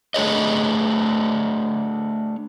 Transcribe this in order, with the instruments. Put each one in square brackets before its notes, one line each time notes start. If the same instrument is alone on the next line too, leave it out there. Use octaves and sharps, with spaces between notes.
[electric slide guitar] A3 D4 G#4 C#5 D#5